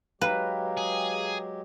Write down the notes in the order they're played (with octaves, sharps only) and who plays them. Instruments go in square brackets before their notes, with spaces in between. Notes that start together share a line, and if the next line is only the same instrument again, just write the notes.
[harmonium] F#3 G#3 G4 [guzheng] B4 [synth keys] F5 G5 A#5
[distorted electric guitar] G#4